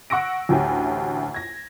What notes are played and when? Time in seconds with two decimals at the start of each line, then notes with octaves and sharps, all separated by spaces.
0.10 F#5 C#6 E6 A#6 D7
0.49 A1 D2 A2 G4 G#5
1.34 G#6 A#6